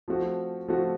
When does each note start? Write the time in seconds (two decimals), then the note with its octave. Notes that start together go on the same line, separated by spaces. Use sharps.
0.08 F3 A3 C4 F#4
0.68 F3 A3 C4 F#4